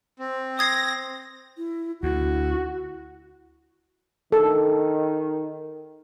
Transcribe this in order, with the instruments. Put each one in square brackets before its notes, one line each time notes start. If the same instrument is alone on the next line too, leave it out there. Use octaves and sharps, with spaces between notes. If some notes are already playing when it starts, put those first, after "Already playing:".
[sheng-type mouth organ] C4
[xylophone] D#6 G#6 C7 [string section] A#6
[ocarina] E4
[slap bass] D2 [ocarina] E4 [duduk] F#4
[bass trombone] D#3 [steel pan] A4